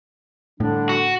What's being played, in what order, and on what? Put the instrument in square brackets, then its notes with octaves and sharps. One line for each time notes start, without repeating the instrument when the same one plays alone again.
[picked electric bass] A2 [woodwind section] D3 G3 D4
[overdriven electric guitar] F#4